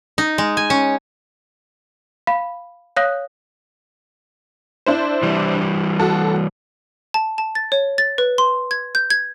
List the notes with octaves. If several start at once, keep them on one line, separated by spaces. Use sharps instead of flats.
D#4
G#3
G#5
C#4
F5 B5
C#5 F5 D#6 F#6 A#6
D4 E4 C5
E3 G3
F#4 A4
A5
A5
A6
C#5
A6
B4
C6
G#6
G6
G#6